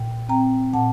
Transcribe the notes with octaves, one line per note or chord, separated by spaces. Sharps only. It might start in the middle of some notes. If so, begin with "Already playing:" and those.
Already playing: A#2 G5
C4 G5 A#5
A#2 F#5 A5